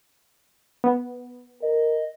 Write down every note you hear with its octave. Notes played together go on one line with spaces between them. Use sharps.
B3
A#4 D#5